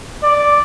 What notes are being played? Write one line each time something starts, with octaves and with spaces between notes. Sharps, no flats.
D5